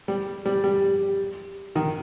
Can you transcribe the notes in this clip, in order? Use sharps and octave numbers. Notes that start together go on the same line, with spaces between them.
G3
G3
G3
D#3